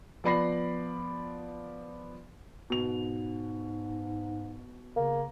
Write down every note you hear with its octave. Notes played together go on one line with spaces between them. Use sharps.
F3 B3 D5 B5 A#6 C7
G#2 B2 F7
C#3 A#3